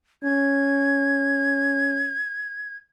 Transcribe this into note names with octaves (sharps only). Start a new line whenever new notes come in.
C#4 G#6